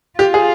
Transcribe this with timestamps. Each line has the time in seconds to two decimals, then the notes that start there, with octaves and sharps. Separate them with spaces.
0.19 F4 G4
0.34 G#4